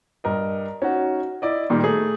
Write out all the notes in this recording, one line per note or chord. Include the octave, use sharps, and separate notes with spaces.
G2 A#4 D#5
C#4 D#4 F#4
E4 D5 D#5
A#2 D#3 G3
A3 G#4